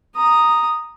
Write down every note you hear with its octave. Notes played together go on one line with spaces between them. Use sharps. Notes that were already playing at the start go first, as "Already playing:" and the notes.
A#5 D#6